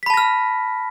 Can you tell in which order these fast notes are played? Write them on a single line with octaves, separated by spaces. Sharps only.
B6 B5 A5 A#6 F6